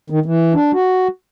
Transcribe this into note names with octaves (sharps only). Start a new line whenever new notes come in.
D#3
E3
D4
F#4